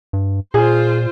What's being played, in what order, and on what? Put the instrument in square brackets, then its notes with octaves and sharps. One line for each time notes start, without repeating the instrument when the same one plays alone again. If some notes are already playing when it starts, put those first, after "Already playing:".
[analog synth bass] G2
[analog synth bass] A#2 [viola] F4 C5 [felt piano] G#4